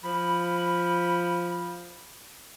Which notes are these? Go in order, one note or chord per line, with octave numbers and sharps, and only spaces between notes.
F3 B5